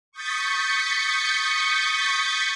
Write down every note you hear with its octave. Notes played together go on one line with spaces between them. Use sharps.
C#6 D#6 G6 A6 B6 C#7